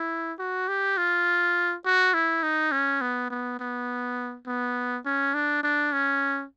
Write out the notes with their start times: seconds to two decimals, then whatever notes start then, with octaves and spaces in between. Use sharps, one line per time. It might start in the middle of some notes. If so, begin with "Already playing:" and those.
Already playing: E4
0.39 F#4
0.68 G4
0.97 F4
1.85 F#4
2.14 E4
2.43 D#4
2.72 C#4
3.01 B3
3.30 B3
3.60 B3
4.46 B3
5.05 C#4
5.34 D4
5.63 D4
5.93 C#4